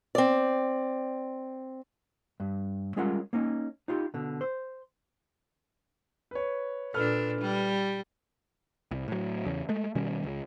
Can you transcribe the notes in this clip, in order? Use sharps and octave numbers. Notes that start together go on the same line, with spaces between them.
C4 D5
G2
G3 G#3 C#4 F4 A#4 F#5
A#3 C#4 D#4
D#4 F4 G4
B2 D3
C5
B4 C#5
A#2 D4 A4 B4 F6
G3
C2
A2 F#3
E2 C#3
G#3 A3
B2 D#3 G3 C#4
C#2